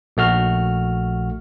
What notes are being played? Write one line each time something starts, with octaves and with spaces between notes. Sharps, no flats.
A#1 A3 F#4 F6